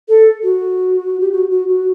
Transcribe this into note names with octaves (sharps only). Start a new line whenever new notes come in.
A4
F#4
G4
F#4
F#4
F#4